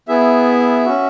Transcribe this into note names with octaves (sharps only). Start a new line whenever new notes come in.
B3 E4 G#4 E5
C#4 F#4